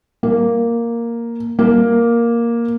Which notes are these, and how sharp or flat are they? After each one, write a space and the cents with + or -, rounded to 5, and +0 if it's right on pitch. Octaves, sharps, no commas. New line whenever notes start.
A#3 +0
A#3 +5